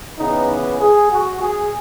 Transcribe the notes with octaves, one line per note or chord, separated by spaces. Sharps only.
C#3 E3 B3 D#4
G#4
F#4
G#4